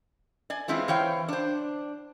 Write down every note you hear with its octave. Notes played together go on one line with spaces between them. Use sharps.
D5 G#5
E3 G#3 C4 E4 F4
E3 C5 C#5 F5 G5
D4 C5